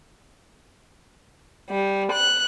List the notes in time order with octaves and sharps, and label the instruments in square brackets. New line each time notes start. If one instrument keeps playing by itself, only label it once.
[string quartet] G3
F#6